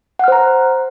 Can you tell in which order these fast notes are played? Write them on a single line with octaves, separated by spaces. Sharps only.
F#5 F6 C5 A#5